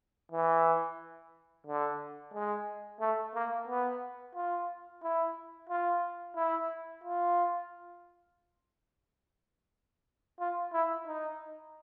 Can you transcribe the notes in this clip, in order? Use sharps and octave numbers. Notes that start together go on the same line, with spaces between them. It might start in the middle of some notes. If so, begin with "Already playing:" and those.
E3
D3
G#3
A3
A#3
B3
F4
E4
F4
E4
F4
F4
E4
D#4